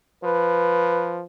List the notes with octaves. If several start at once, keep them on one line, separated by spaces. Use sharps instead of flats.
F3 B4